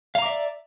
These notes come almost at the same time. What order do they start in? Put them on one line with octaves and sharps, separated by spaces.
F5 A#5 D6 E5 D5